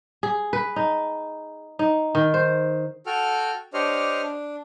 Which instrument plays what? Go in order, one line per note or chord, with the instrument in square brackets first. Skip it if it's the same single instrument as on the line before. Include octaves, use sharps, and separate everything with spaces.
[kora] G#4
B4
D#4
D#4
D#3
C5
[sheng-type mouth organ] F#4 A4 G5 F6
D4 G4 C5 C#5 D#5 F6
D4